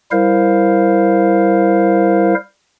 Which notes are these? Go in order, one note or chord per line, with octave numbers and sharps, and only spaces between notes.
G3 E4 A#4 C5 F5